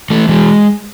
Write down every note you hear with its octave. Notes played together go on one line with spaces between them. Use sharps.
E3 A3
E3 G#3